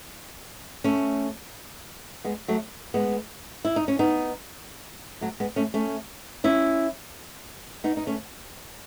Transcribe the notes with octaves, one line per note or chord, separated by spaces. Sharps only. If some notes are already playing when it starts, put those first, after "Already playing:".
A3 C#4
G#3 B3
F#3 A3
G#3 B3
E4
D#4
C#4
B3 D#4
F#3 A3
G#3 B3
A3 C#4
A3 C#4
C#4 E4
B3 D#4
D#4
A3 C#4